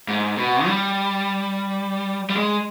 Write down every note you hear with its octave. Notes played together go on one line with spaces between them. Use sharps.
G#2
B2
G3
G3
G#3